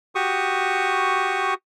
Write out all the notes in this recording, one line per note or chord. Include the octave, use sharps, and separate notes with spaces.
F#4 G4 C#6 D#6